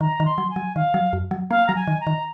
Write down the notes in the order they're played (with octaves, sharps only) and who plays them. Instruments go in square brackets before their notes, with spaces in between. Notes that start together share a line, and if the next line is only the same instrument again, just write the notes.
[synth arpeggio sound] D#3 [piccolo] A#5
[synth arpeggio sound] D#3
[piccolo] C6
[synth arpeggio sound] F#3
[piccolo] G#5
[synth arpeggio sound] F#3
[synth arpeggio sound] D#3 [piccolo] F5
[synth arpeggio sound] F#3
F#2
F#3
[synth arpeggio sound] A#3 [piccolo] F5
[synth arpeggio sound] F#3 [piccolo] A#5
[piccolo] G#5
[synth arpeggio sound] D#3
[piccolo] A#5
[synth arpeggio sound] D#3